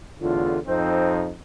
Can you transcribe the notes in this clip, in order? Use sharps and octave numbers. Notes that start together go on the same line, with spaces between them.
E2 A2 D3 F4
F2 C4 D#4 C5